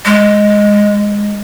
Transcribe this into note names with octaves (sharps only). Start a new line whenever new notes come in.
G#3